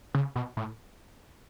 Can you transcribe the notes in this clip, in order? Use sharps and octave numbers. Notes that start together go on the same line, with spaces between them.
C#3
B2
A2